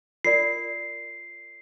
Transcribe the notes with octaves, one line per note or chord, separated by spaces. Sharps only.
F4 A#4 D5 C7